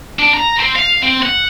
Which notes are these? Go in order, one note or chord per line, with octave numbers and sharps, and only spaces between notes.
D4
A#5
C4
F5
C4
F#5